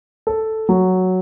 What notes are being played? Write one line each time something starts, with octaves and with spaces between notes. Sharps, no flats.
A4
F#3